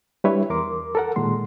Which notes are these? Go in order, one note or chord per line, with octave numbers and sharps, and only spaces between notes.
G3 D4 E4 B4 C#5 E5
E2 A#4 C6 D6
A4 A#4 F#5
A#2 D#3 G#3 C6